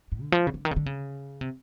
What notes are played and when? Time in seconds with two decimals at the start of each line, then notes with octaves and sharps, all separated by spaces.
0.12 G#2
0.22 D3
0.32 F3
0.47 C#3
0.54 D3
0.65 D#3
0.71 C#3
0.76 D3
0.86 C#3
1.41 C3